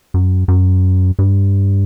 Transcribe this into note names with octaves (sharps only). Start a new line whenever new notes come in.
F#2
F#2
G2